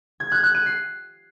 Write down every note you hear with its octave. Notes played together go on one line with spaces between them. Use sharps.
G#6
F#6
F#6
D#7
C7